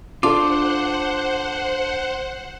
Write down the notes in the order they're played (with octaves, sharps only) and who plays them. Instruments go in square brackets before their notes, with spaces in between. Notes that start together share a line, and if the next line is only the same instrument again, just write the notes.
[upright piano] D4 A4 [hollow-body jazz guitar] F4 [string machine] C5 F#5 [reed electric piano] D6